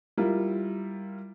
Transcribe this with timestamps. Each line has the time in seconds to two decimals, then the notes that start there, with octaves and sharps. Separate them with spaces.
0.18 G3 E4 F4 A#4